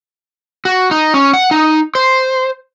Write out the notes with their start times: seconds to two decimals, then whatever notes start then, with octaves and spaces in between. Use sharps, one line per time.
0.65 F#4
0.91 D#4
1.14 C#4
1.33 F#5
1.51 D#4
1.95 C5